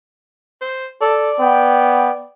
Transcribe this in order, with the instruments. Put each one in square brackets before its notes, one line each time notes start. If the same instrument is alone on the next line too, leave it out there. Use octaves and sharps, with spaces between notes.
[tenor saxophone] C5
[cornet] A4 [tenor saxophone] D5
[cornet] B3 [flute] G5